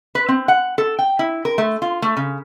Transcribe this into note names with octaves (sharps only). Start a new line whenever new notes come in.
B4
C4
F#5
A4
G5
E4
A#4
A3
F4
A3
C#3